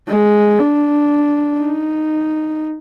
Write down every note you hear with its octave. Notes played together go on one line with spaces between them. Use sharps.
G#3
D4
D#4